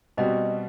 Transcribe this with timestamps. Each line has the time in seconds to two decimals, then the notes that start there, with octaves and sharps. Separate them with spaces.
0.17 B2 G3 C4 F#4 D#5